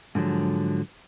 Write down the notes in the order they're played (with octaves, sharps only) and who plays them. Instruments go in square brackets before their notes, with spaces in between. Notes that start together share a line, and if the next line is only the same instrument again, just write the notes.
[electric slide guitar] G#2 D3 F3 F#3